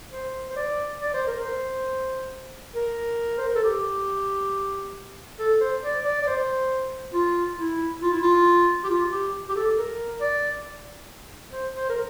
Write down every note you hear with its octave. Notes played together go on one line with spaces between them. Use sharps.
C5
C5
D5
D5
C5
A#4
C5
A#4
C5
A#4
A4
G4
A4
C5
D5
D5
D5
C5
F4
E4
F4
E4
F4
G4
F4
G4
G4
A4
A#4
D5
C5
C5
A#4